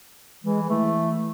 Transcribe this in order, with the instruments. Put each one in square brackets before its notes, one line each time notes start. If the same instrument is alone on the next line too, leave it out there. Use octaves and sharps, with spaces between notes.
[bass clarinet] E3 [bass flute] G#3
[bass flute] E3 [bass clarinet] A3